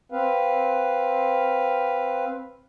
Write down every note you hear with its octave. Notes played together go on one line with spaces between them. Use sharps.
C4 B4 F5